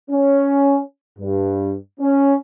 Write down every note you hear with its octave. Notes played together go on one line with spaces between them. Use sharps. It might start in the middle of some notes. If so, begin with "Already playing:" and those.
C#4
G2
C#4